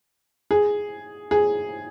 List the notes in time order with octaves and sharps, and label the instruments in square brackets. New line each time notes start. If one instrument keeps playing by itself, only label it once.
[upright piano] G#4
G#4